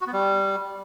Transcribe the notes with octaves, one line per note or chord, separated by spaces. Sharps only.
F#4
B3
G3